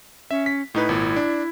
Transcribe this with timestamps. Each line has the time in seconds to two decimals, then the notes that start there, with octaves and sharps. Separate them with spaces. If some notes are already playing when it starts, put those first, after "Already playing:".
0.31 C#4 E5
0.46 B6
0.74 A2 D#4 E4 B4
0.89 G#1 A#2
1.16 D4